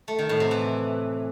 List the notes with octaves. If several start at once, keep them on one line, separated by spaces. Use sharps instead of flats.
A3
D#3
A2
C3
E3